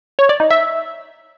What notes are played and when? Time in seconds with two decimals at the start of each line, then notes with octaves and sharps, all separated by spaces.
0.19 C#5
0.29 D5
0.40 D#4
0.51 E5